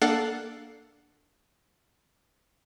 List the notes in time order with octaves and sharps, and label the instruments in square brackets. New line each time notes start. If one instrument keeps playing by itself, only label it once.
[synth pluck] A#3 D4 A4 F5 F#5 A5